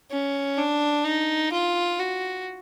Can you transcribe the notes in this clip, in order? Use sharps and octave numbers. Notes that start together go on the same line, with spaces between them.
C#4
D4
D#4
F4
F#4